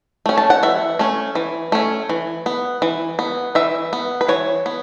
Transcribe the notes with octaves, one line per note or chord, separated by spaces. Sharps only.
A3 C#4
A5
F#5
E3 E5
A3 C#4
E3
A3 C#4
E3
B3
E3
B3
E3 E5
B3
B4
E3 C#5
B3